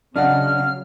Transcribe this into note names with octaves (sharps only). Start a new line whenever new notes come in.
C#3 F#3 D4 D#5 F#5 F6